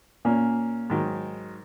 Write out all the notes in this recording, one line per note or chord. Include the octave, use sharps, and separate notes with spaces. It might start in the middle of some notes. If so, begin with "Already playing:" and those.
A#2 A#3 C#4
G#2 D#3 F#3